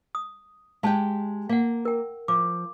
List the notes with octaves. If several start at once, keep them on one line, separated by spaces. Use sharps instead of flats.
D#6
G#3 G4 F5 G5 A5
A#3 F5 F#5
A#4 G5
F3 D6